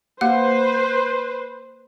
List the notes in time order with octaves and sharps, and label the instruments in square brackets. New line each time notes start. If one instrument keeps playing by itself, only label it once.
[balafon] A#3 G4 F#5 [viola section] B4 C5